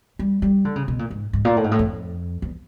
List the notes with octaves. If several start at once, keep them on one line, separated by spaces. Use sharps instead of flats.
G3
G3
D3
C#3
B2
A#2
G#2
G#2
A#2
A2
G#2
A2
F2
E2